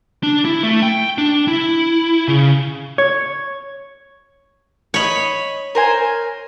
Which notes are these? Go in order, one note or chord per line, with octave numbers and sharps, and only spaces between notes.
D4
E4
A3
G5
D4
E4
C#3
C#5
C#5 D#5 B5 C#6
A#4 C5 G#5